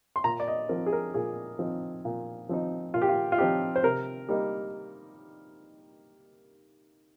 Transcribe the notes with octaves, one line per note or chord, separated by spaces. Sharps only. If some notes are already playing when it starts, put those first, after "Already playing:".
C6
A#2 A#5
D5
D#5
F3 C4 D#4 A#4
G#4
A#4
A#2 G#4
F3 C4 D#4
A#2
F3 C4 D#4
A#2 F4
G4
F4
F4
F3 C4 D#4 G4
C5
C3 A#4
G3 A#3 D#4